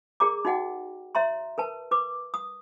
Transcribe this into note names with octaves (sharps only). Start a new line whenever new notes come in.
G#4 A#4 D5 A#5 D6
D#4 F#4 D#5 F#5 G5
C#5 E5 A#5 C6
A#4 B4 A5
B4 D6
D#6